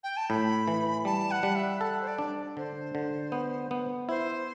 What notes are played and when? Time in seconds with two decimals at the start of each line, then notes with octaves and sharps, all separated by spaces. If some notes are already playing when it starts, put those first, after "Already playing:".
0.03 G5
0.17 A5
0.29 A2 B5
0.68 E3
1.05 G3 A5
1.31 F#5
1.43 G3
1.55 E5
1.81 A4 F#5
2.01 C5
2.07 D5
2.19 D4
2.57 D3 C5
2.95 D3
3.32 B3
3.71 B3
4.08 E4 C5